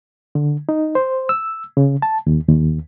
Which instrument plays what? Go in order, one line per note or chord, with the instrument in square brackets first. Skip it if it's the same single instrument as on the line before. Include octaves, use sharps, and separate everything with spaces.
[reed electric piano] D3
D#4
C5
E6
C#3
A5
D#2
D#2